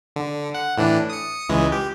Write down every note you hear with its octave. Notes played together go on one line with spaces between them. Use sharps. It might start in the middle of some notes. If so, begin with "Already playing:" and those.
D3
F#5
A2 E3 D4
D#6 C#7
C#2 E3 G#3
G4